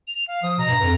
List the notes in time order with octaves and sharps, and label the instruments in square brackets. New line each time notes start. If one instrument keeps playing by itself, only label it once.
[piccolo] F7
F5
[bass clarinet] F3 [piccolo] D#6
[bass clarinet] B2 [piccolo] A#5
[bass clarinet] G2
F2